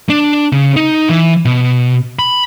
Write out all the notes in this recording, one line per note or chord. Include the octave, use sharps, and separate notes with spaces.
D4
C#3
D#4
E3
B2
B5